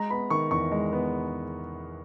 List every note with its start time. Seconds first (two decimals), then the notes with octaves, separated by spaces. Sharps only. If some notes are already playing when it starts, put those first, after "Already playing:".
Already playing: G#3 A#5
0.10 B3 B5
0.30 D#3 C#6
0.51 E2 C#6
0.72 G#3
0.92 B3